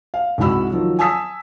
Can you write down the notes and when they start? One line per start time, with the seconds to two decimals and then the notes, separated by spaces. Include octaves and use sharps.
0.14 F5
0.38 C2 G#2 E4 F#4 B5 E6
0.72 D#3 F3 F#3
0.99 G#5 A5 D#6 E6 B6